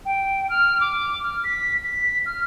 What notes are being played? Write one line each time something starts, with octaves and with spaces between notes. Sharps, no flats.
G5
F6
D6
F6
B6
B6
F6